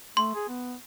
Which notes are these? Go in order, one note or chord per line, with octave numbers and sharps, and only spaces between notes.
A3 C6
G#4
B3